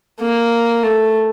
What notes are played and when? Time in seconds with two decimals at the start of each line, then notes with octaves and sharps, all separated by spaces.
0.21 A#3
0.83 A3